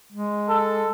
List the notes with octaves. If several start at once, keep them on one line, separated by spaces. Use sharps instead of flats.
G#3
A4